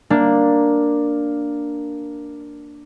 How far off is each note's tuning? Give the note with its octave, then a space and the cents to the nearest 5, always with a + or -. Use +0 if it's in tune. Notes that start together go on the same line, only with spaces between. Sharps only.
A#3 +0 D4 +0